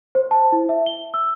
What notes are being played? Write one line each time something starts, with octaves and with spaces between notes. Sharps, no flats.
C5
A5
E4
E5
G7
E6